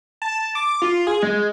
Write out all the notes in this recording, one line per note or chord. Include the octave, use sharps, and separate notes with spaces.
A5
D6
F4
G#4
G#3